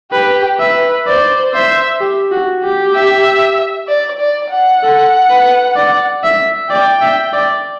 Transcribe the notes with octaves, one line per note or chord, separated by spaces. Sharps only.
G4 B4
B4 E5
C5 D5
C5 E5
G4
F#4
G4
E5
D5
D5
F#5
A4
B4
D5
E5
D5 G5
E5
D5